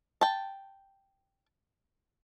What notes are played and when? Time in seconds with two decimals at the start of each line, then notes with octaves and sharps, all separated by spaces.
0.21 G5 A5